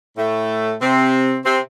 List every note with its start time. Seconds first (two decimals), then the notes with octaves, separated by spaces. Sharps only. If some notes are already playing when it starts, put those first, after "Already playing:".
0.17 A2 A3
0.81 C3 C4
1.45 C3 C4